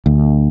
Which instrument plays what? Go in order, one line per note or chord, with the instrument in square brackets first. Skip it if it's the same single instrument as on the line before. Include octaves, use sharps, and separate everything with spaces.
[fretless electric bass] D2